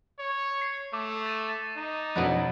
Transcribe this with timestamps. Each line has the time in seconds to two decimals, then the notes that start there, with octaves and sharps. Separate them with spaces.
0.20 C#5
0.62 C7
0.93 A3 D6
1.26 A6 D#7
1.77 D#4
2.16 F2 B2 F#3 D4 E4 B4